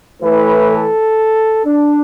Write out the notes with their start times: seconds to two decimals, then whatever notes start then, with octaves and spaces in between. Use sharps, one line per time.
0.21 A2 E3 A3 B4
0.70 A4
1.65 D4